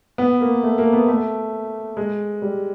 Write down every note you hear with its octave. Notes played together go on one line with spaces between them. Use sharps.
B3
A#3
A3
A#3
B3
A3
G#3
G3